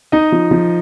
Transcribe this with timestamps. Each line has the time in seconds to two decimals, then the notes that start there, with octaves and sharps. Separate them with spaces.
0.12 D#4 D#5
0.32 F3
0.51 F3